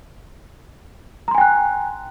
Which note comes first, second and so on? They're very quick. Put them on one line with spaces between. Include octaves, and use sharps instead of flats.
A#5 C6 G#5 G5 F#6